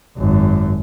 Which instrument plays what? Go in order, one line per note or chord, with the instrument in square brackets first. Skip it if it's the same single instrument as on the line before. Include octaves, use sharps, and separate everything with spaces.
[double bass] G#1 F#2